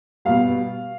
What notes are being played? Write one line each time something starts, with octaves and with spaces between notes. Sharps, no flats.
B2 G3 F5